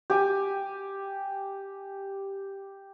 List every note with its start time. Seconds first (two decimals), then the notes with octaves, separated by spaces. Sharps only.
0.10 G4 G#5